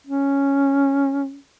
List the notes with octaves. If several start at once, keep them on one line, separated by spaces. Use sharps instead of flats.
C#4